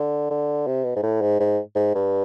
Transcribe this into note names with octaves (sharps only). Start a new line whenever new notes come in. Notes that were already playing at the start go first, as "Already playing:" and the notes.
Already playing: D3
D3
C3
B2
G#2
A2
G#2
G#2
G#2
G2